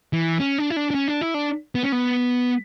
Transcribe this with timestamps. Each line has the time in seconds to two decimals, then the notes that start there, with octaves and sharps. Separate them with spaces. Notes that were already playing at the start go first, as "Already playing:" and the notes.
0.13 E3
0.40 C#4
0.58 D4
0.70 E4
0.76 D4
0.91 D4
0.95 C#4
1.08 D4
1.21 E4
1.34 D4
1.75 B3
1.84 C#4
1.92 B3